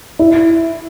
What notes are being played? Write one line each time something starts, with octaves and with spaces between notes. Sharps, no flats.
E4